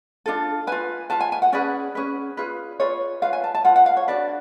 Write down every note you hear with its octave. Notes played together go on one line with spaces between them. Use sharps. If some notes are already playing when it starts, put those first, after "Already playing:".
D4 F4 A4
F4 B4 G#5
F4 B4 A5
G#5
G#5
F#5
C#4 G#4 B4 D5
C#4 G#4 B4
F4 G#4 B4
F4 G#4 B4 C#5
F4 B4 F5
G#5
A5
A5
F4 B4 F#5
F#5
F5
C#5
D4 F#4 B4 D5